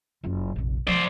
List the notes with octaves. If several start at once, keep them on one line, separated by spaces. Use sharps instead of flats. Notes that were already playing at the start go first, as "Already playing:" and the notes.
F#1 F4
F1 A#1
F3 A#3 C5 D5